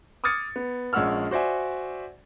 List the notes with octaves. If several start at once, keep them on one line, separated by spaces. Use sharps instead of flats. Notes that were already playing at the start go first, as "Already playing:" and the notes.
D6 D#6 F6 G#6 A6 C#7
B3
A#1 G#3 C#4 F#5 E6 F6
F#4 C5 D5 E5 G#5